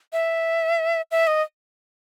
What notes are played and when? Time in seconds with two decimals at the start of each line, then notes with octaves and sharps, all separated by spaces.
0.13 E5
1.11 E5
1.27 D#5